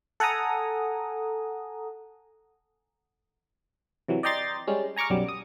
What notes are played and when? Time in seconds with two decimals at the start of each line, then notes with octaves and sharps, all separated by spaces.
0.20 A4 F#5 G#5 A#5 D#6
4.08 C3 E3 F#3
4.23 D5 D#5 G5 A#5 C6 A6
4.67 G3 G#3 C#4
4.96 G#5 A#5 C#6 D6 F6
5.10 B1 F#2 F#3 G3 D6
5.29 D#6